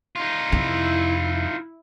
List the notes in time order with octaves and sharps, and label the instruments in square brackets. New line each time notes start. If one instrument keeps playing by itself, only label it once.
[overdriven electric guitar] D#4 F4
[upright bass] F2 C3 [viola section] E4